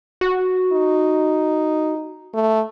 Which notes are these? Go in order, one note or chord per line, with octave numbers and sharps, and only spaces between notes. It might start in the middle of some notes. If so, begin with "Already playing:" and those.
F#4
D#4
A3